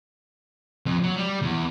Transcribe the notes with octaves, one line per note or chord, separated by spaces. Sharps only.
F2
F#3
G3
E2